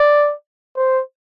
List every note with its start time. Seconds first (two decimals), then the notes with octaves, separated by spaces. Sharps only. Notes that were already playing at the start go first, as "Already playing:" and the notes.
Already playing: D5
0.77 C5